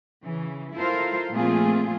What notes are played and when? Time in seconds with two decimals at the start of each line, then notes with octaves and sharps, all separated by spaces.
0.23 C#3 E3
0.75 E4 F4 A4 A#4 C5 F5
1.32 A#2 F3 A3 C4 F4 G#4